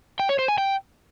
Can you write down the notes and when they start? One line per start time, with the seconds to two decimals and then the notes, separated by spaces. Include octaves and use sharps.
0.20 G5
0.29 C#5
0.39 C5
0.48 G#5
0.58 G5